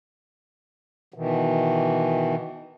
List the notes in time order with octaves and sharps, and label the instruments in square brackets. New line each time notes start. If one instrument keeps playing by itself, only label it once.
[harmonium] B2 D#3 E3